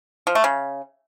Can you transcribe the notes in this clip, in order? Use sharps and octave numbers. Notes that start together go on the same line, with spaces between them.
F3
A3
C#3